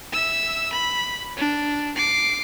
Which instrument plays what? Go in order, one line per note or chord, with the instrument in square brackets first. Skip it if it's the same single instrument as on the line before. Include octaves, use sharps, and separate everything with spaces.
[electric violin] E5 E6
B5
D4
D6 C7